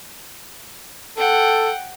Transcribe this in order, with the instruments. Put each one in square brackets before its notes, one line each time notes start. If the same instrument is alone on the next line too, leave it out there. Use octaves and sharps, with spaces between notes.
[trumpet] A4 [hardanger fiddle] F#5 G5